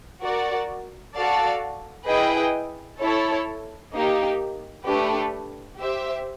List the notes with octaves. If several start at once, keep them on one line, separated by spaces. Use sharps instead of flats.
F#4 A#4 D5
F#4 A4 D5 F5 A5
E4 G#4 B4 D#5 G5
E4 A4 C#5
A#3 D#4 G4
A3 D4 G4 B4
G4 C5 E5